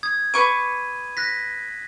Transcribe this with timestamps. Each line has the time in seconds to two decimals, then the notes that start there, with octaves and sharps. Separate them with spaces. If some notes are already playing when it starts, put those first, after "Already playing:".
0.03 D#6 G#6
0.34 B4 C#6 D6 D#7
1.17 F#6 A#6 B6